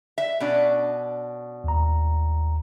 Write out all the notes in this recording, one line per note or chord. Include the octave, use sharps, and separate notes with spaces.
E5
B2 C#4 D4
D#2 A#5